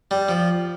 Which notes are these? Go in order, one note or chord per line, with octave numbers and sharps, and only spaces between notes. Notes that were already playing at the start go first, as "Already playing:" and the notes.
G3
F3